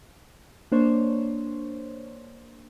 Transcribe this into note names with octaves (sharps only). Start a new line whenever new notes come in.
A#3 D4 C5 C#5